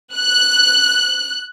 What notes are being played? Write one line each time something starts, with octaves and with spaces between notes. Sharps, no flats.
F#6